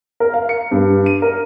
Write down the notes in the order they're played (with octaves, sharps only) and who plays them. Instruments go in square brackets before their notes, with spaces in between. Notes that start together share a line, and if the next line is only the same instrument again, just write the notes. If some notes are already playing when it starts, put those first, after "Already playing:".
[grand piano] A#4
F5
C#7
G2
D#7
A#4